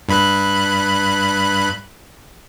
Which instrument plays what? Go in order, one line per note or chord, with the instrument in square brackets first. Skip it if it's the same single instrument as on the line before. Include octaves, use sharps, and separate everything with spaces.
[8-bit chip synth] G2 B5 F#6